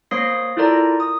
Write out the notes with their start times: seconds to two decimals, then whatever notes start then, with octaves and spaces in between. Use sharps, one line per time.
0.11 A#3 C5 C#5 D#6 A#6 C7
0.57 E4 F4 A4 A#4 D5 A#5
1.00 D#6